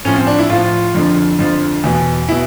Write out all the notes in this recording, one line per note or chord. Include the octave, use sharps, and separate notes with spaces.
A2 F3 C#4
C4
D4
E4
A2 F3 F4
F2 D3 F3
F2 D3 F3
E2 B2
B2 E4